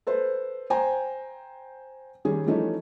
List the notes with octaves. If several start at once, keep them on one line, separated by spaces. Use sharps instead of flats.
A4 B4 C5
C5 G5 G#5 A#5
D#3 G3 C#4 G#4
E3 F3 G3 A3 C#4 D#4